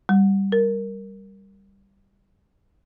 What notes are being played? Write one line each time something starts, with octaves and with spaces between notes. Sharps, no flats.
G3
A#4